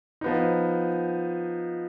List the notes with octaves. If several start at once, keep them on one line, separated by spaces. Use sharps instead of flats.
F3 B3 D#4